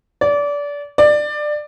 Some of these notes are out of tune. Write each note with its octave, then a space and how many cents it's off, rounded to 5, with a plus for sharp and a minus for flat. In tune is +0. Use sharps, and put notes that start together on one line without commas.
D5 -25
D5 +20